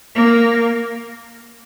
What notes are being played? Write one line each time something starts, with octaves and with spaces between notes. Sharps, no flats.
A#3